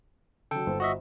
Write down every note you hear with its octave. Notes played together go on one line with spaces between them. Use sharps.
C#3 F#3 A4 G5
G1 C5
F#4 D#5 E5